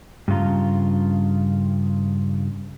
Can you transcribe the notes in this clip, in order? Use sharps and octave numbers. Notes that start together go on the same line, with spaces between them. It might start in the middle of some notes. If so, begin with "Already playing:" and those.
G2 C#3 F4 A#5